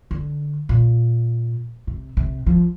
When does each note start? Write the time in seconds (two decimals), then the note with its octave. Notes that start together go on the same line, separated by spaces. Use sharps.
0.11 D3
0.69 A#2
1.87 C3
2.17 C3
2.46 F3